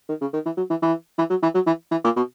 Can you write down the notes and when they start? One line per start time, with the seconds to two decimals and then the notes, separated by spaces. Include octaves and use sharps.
0.09 D#3
0.21 C#3
0.33 D#3
0.46 E3
0.57 F#3
0.70 E3
0.82 E3
1.18 E3
1.30 F#3
1.43 E3
1.54 F#3
1.67 E3
1.91 E3
2.04 A#2
2.16 B2